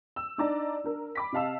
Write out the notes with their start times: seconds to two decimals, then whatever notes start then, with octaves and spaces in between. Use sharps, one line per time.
0.16 E6
0.38 D4 D#4 D5 A#5
0.84 D4 A#4
1.15 B5 D6 B6
1.32 C3 D#5 F5 A5 E6